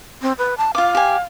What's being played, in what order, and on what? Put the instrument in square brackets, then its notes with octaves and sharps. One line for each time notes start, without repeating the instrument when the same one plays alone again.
[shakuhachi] C4
B4
A5
[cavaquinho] F4 D6 [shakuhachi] F5
[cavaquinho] G4 G#5